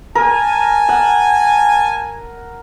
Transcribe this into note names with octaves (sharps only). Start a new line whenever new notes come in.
A#4 G#5 A5
F#5